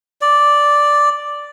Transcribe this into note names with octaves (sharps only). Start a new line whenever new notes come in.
D5